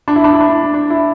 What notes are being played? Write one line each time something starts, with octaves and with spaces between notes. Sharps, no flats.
D4
E4
D4
E4
D4
D4
E4